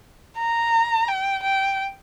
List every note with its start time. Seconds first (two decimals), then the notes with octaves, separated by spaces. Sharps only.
0.38 A#5
1.08 G5
1.43 G5